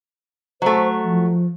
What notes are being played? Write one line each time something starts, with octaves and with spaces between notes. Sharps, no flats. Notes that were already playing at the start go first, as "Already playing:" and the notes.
F#3 A3 C5
F3